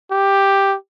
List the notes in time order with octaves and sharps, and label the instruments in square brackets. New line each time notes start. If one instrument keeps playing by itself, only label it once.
[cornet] G4